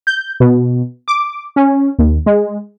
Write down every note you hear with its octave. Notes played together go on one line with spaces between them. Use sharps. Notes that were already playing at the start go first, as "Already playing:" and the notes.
G6
B2
D6
C#4
D#2
G#3